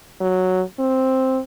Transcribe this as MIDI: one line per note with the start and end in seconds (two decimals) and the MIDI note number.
0.21 0.62 54
0.79 1.40 60